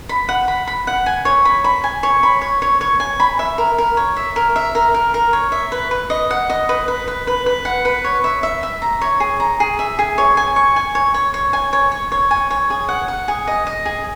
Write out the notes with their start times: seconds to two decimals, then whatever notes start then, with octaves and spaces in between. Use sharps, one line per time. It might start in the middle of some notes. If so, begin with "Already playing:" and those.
0.09 B5
0.29 F#5
0.48 B5
0.67 B5
0.87 F#5
1.06 G#5
1.25 C#5
1.45 B5
1.64 B5
1.84 G#5
2.03 C#5
2.23 B5
2.42 C#5
2.62 C#5
2.81 C#5
3.00 G#5
3.20 B5
3.39 E5
3.58 A#4
3.78 A#4
3.97 C#5
4.16 E5
4.36 A#4
4.56 E5
4.75 A#4
4.94 A#4
5.14 A#4
5.33 C#5
5.52 E5
5.72 B4
5.91 B4
6.10 D#5
6.30 F#5
6.50 D#5
6.69 B4
6.88 B4
7.08 B4
7.27 B4
7.46 B4
7.65 F#5
7.85 B4
8.04 C#5
8.24 E5
8.43 E5
8.63 E5
8.82 A#5
9.01 C#5
9.20 G#4
9.40 A#5
9.60 G#4
9.79 E5
9.99 G#4
10.18 C#5
10.37 G#5
10.56 C#6
10.76 G#5
10.95 C#5
11.14 C#5
11.34 C#5
11.53 G#5
11.73 C#5
11.92 C#5
12.12 C#5
12.31 G#5
12.51 C#5
12.70 G#4
12.89 F#5
13.08 F#5
13.28 G#4
13.47 D#5
13.67 D#5
13.85 G#4